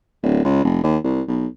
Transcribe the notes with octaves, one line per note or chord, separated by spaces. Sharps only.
D1
C#2
F1
D#2
C2
B1